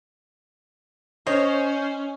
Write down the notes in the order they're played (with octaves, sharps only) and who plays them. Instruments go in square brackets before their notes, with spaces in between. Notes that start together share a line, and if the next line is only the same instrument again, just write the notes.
[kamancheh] C#4 [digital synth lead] C5 [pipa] C#5 [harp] D#5